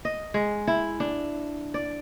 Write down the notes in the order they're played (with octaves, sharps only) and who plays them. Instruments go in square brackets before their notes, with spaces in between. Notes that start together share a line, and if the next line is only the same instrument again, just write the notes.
[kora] D#5
G#3
E4
D4
D5